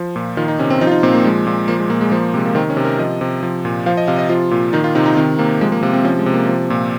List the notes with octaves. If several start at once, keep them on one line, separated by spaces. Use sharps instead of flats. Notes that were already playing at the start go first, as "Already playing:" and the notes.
Already playing: F3
A#2
D#3 F4
D#4
C3 C#4
C4
F3 D#4
F4
D#4
A#2 C4
A#3
F3 G#3
A#2
F3 A#3
G#3
A#2 A#3
G#3
F3 A#3
C3 G#3
A#3
D#3 C4
C#4
C3
A#4
F3 D#5
C3
F3
A#2
F3 F5
D#5
C3 F5
D#5
F3 F4
A#2
D#3 D#4
F4
C3 D#4
D#4
D#3 C4
C3 A#3
F3 G#3
A#3
C3 A#3
C4
F3 C#4
G#3
C3
A#3
F3
A#2